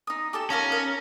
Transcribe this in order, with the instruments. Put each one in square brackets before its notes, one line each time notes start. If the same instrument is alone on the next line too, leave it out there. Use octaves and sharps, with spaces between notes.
[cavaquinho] D#4 D#6
G4 A4 A5
[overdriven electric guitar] C#4 [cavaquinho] D#4 F4 A#4
[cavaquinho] A#4